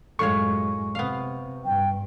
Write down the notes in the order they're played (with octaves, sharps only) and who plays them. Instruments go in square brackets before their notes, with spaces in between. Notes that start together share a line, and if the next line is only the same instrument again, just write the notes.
[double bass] F#2 G#3 [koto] A2 F4 C#5 [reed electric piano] C#6
[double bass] C3 [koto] B3 F5
[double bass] G2 [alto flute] G5